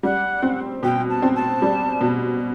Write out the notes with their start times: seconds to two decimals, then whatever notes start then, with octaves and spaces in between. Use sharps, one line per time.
0.03 G3 F#5
0.42 C4
0.83 B2 G5
1.09 A5
1.22 C4
1.35 A5
1.62 G3
2.01 B2